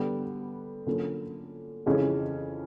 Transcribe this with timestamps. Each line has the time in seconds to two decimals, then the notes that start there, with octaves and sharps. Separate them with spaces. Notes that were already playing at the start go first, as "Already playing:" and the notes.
Already playing: D3 G3 B3
0.86 D3 F#3 A#3 C#4 F4
1.86 F2 C#3 E3 G#3 C#4